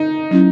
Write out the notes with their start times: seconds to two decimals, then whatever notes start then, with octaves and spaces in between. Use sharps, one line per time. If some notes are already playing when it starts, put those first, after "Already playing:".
Already playing: D#4
0.31 F#3 C#4 E4